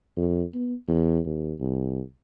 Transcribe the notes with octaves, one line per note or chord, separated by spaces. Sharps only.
F2
B3
E2
D#2
C2